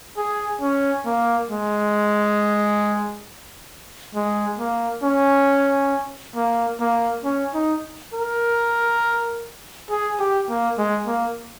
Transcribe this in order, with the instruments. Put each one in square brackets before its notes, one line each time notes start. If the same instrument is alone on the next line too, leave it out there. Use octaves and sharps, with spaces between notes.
[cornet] G#4
C#4
A#3
G#3
G#3
A#3
C#4
A#3
A#3
C#4
D#4
A#4
G#4
G4
A#3
G#3
A#3